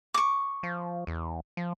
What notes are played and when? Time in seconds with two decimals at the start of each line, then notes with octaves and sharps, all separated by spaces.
0.14 C#6 D6
0.63 F3
1.07 E2
1.57 F3